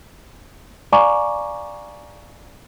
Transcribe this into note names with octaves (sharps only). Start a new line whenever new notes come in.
D5 F5 G#5 A#5 C#6 D6